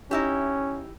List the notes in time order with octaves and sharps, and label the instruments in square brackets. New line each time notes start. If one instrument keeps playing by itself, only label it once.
[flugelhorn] C#4 [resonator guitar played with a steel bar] D#4 E4 G4